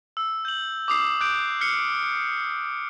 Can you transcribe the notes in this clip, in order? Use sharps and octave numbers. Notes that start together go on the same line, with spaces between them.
E6
G6 F#7
D6 D#6 C7
D6 F#6 G6 D7
F6 C7 C#7